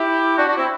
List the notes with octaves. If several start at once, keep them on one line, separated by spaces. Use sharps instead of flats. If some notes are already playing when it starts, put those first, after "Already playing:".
Already playing: E4 G4
D4 F#4
D4 F#4
C4 E4